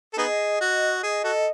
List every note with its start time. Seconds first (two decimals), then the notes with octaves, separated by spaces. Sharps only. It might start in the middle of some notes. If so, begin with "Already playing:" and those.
0.13 A4
0.18 B3 D#4 G#4 D#5
0.61 F#4
1.03 G#4
1.24 F#4 A4